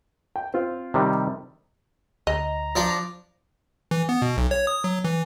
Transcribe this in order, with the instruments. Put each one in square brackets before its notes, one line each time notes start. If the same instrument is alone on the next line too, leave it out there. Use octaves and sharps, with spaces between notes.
[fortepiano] G5
C4 F4
[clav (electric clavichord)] C3 D#3 G3
[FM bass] D2 [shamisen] D#5 [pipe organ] A#5
[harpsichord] F3 D4
[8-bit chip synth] E3
B3
B2
B1
C#5
D#6
F#3
E3